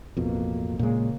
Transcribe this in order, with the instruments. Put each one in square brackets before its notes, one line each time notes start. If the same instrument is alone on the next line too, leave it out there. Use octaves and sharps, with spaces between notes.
[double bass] A1 A#3 [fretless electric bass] F2 B2
[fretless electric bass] A#2 G#3 [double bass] C#3 A#3